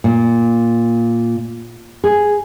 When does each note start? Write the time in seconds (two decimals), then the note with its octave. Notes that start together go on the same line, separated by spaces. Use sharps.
0.04 A#2
2.04 G#4